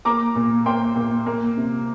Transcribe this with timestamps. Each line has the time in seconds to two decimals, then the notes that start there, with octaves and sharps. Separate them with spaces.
0.05 A#3 A#5 D6
0.35 A#2
0.66 A#3 G5 C6
0.96 A#2
1.26 A#3
1.57 C3